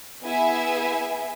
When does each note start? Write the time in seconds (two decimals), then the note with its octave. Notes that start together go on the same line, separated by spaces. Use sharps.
0.23 B3 E4 G#4 E5 G#5